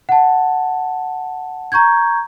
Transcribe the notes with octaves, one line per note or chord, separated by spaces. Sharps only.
F#5 A5
A#5 C#6 G6 G#6